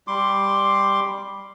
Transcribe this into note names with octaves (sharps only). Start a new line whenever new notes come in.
G3 C6 D6